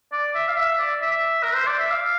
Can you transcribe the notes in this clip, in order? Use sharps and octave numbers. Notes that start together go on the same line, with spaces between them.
D5
E5
F5
E5
D5
E5
A#4
C5
D5
E5
F5